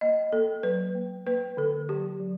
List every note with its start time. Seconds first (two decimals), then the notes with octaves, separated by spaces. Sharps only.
0.01 A#3 D#5
0.32 A#3 A4
0.63 F#3 B4
0.95 A#3
1.27 A#3 B4
1.57 D3 A4
1.89 F#3 G4
2.20 F#3